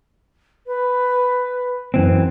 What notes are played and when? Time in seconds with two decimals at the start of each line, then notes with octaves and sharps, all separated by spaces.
0.67 B4
1.94 F#2 E3 C4